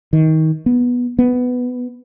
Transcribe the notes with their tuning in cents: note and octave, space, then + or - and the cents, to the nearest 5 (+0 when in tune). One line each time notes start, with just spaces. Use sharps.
D#3 +25
B3 -10
B3 +10